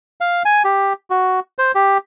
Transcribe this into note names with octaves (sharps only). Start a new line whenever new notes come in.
F5
G#5
G4
F#4
C5
G4